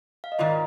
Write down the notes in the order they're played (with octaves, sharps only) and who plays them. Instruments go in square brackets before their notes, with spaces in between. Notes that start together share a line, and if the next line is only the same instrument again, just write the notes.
[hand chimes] F5
D#5
[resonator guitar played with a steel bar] G#2 D#3 A#3 F4 [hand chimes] D5